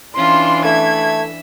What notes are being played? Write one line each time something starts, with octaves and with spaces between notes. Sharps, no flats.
E3 C#4 D4 F4 C6
A3 E5 G#6